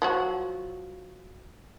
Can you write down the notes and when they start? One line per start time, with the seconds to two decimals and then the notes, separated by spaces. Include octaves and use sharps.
0.02 F3 F#3 F#4